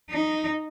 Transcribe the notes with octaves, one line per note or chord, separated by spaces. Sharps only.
D#4